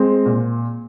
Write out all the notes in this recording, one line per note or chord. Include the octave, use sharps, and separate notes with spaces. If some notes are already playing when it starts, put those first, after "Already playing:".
Already playing: G#3 C4
A#2